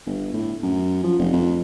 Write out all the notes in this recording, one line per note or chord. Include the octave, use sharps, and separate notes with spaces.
G1
A2
F#2
F3
F1
F2